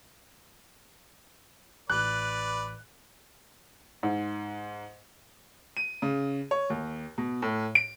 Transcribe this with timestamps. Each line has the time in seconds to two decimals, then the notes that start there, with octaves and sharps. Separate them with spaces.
1.90 A1 B4 D5 F#6
4.03 G#2
5.77 D#7
6.02 C#3
6.51 C#5
6.70 D#2
7.18 B2
7.42 A2
7.75 D7